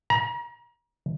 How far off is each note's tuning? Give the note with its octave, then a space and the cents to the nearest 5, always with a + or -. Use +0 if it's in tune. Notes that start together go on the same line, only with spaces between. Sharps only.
A#5 +35